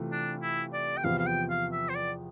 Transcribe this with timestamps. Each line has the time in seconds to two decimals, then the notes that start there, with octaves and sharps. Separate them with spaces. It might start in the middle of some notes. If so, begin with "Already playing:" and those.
Already playing: C3 E3 A3 F4
0.12 D4
0.42 E4
0.73 D5
0.97 G5
1.04 E2 C3 F3 B3 F5
1.19 F5
1.27 G5
1.50 F5
1.73 E5
1.89 C5
1.96 D5